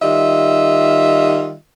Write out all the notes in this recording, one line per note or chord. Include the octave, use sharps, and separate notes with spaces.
D#3 G3 F4 D#5 E5